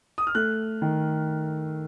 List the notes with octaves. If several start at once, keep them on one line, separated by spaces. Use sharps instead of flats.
D#6
F6
A3 F#6
D#3